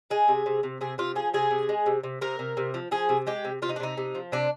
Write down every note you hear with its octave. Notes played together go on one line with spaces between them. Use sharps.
G#3 G#4
C3
C3
C3
C3 G#4
C3 F4
F3 G#4
C3 G#4
C3
G#3
C3
C3
C3 A#4
C3
C3
F3
F3 G#4
C3
G#3 G4
C3
C3 F4
D#4
D4
C3 D#4
C3
F3
C3 D4